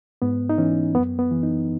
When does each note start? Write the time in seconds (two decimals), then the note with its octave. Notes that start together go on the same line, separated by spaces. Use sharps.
0.22 G#2 B3
0.49 D#4
0.58 E3 C#4
0.95 F#2 B3
1.19 B3
1.31 E3
1.43 D#4